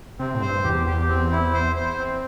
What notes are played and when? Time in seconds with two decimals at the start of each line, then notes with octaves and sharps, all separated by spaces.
0.19 C3 C4
0.35 A2
0.41 G2 C5
0.64 E2 G4
0.87 G4
1.09 C4
1.32 E4
1.54 C5
1.76 C5
1.98 C4